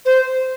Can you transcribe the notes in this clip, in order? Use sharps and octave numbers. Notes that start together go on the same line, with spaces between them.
C5